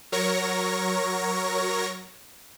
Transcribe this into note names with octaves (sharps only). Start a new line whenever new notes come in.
F#3 A#4 C#5 C#6 A#6